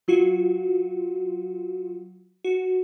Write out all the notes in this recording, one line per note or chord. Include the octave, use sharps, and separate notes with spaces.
F#3 F4 F#4
F#4